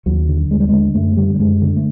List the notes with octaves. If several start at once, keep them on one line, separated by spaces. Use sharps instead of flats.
D#2 F#3
D3
D#2 G#3
G3
D3 G#3
F#2 A3
D3 G3
G3
F#2 G#3
D3
A3